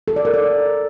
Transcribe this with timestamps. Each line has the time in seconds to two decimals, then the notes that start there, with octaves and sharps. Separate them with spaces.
0.08 A4
0.16 D5
0.25 A#4
0.34 D5